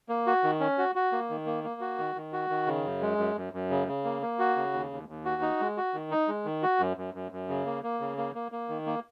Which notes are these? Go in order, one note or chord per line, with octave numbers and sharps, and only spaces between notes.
A#3
F#4
D#3
C#4
F#4
F#4
A#3
D#3
A#3
A#3
F#4
D#3
D#3
F#4
D#3
C#3
F#2
G#3
F#2
F#2
F#2
C#3
C#3
A#3
A#3
F#4
C#3
D#2
D#2
D#2
F#4
D#4
G#3
F#4
D#3
D#4
G#3
D#3
F#4
F#2
F#2
F#2
F#2
C#3
A#3
A#3
C#3
A#3
A#3
A#3
D#3
A#3